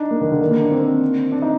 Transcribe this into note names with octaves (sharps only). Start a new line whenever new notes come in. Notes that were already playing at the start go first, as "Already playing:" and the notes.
Already playing: D4 D#4
A#3
D#3
D3
D#3
A#3
D4
C4
D4
D#4